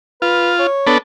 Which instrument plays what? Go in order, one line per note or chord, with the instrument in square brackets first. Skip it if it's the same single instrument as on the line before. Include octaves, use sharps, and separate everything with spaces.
[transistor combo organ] F4 [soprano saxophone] B4
[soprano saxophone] C#5
[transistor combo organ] B3 D4 A4